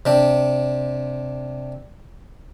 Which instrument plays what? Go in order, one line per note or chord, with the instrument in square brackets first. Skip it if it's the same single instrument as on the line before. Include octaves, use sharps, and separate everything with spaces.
[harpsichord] C3 D4